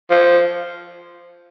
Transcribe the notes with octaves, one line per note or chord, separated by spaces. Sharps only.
F3